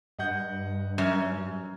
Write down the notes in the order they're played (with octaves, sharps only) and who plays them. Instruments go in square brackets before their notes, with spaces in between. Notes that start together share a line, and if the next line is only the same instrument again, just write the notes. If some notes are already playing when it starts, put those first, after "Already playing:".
[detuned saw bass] G2 [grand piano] D#5 F#5 G6
[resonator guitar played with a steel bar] F#2 [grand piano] F6 G#6